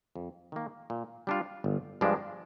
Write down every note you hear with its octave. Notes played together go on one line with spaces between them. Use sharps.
F2
D#3 A#3
A#2
G3 D4 F4
G1
G2 F3 G#3 D4